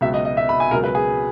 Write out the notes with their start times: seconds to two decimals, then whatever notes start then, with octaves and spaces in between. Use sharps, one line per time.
0.01 C#2 B2 F#3 E5
0.14 D#5
0.25 D#5
0.37 E5
0.49 B5
0.60 G#5
0.71 C#2 B2 F#3 A#4
0.84 B4
0.95 G#4